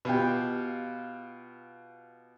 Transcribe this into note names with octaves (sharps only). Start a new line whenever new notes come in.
B2 F4 G4